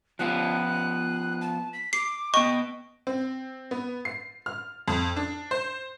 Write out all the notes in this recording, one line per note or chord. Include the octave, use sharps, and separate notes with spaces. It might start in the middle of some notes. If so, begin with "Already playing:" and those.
F3 B3 F4 F#6
A5
B6
D6 C7
B3 D#5 G5 C#6
C4
B3
C7
F6
F2
D4
C5